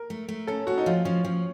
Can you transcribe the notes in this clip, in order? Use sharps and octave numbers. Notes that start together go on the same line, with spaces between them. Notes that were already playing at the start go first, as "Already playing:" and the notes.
Already playing: A#4
A3
A3
C#4 A4
C#4 F#4
D#4
F3 F4
F3 C#4
F3 C#4